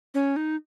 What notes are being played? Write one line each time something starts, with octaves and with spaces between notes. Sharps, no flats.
C#4
D#4